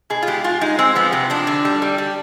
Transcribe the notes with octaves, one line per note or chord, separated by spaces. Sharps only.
B2 G#4
F4
G#3 G4
G#3 F4
G#3 D#4
G#3 C4
F3 B3
C3 C4
F3 D4
D3
G3
G3
G3